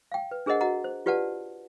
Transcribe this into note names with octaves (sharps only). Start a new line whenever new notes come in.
F5 G5
B4
D4 G#4 A#4 C5 D#5 F#5
F#4 D#5 F#5 A#5
C5
F4 G4 B4 D5 F#5 A5